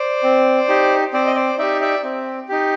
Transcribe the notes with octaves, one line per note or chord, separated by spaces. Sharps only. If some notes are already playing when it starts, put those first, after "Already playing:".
Already playing: C5 D5
C4
D#4 G4
C4 C5 D5
D#5
C5 D5
D#4 G4 D5 E5
D5 E5
C4
D#4 G4